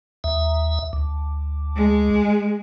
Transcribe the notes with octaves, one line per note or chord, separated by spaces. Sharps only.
D#2 E5
D2
G#3